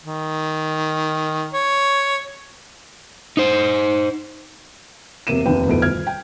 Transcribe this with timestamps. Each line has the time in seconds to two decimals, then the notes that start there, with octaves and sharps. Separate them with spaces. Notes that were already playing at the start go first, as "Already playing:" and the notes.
0.04 D#3
1.54 C#5
3.37 D#4 C5
5.27 E1 C3 A#3 D#7 E7
5.46 F1 D#2 C3 D4 B4 G5
5.67 F1 D2 B2 E4 A4 D7
5.82 D#1 F6 G#6
6.07 G5